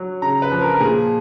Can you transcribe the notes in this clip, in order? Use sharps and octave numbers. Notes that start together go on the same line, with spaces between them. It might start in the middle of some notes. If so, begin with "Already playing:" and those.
Already playing: F#3
C#3 A#5
B4
F3
A#4
A#4
A#2 G#4